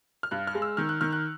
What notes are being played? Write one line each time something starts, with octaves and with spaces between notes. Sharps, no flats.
F6
G2 F#6
F6
G#3
E6
D#3 F6
F#6
D#3 F6
F#6